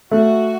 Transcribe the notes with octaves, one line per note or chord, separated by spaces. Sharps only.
A3 F#4